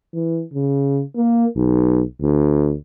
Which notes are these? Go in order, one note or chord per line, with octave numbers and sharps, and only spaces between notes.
E3
C#3
A#3
B1
D2